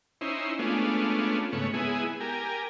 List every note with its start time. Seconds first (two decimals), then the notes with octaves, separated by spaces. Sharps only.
0.21 C#4 D#4 E4 C5
0.59 G#3 A3 B3 C#4 D4 F4
1.52 G#2 C#3 A3 B3 C#5
1.74 G#3 B3 E4 G#4
2.20 G4 A#4 G#5